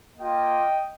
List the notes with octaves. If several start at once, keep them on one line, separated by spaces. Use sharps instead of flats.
A#3 F4 D#5 G5